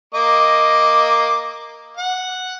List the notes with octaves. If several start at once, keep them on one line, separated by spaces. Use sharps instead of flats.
A#3 D#5 D6
F#5